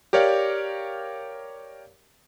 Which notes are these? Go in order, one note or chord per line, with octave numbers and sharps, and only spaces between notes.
G4 A#4 C#5 D5 F5 G5